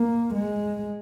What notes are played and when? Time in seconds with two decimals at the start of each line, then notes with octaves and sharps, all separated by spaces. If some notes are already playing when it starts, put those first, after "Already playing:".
Already playing: A#3
0.34 G#3